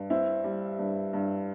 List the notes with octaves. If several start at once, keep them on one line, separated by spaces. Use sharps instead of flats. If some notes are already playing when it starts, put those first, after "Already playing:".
Already playing: G2
C4 E4
G3
G2
G2